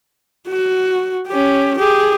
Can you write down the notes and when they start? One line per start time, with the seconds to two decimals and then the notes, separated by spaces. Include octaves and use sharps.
0.48 F#4
1.28 C#4 G4
1.78 G4 G#4